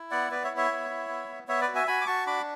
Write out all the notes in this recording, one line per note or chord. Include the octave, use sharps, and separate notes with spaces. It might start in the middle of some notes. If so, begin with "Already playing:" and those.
Already playing: E4
B3 D5 F#5
B3 B4 D5
C#5 E5
E4
C#5 E5
B3
E4
B3
B3
B3 C#5 E5
B4 D5
F#4
E5 G#5
F#4 G#5 B5
D6
F#4 A5 C#6
D4 B5 D6